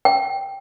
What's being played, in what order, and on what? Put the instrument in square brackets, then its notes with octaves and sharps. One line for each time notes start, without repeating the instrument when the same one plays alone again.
[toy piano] G5